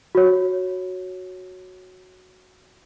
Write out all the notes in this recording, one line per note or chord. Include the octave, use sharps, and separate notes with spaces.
F#4 C#5